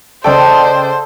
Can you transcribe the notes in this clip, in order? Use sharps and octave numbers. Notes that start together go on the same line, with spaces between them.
C#3 A4 C5 D5 D#5 G5